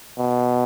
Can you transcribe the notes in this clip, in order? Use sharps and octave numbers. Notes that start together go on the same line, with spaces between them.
B2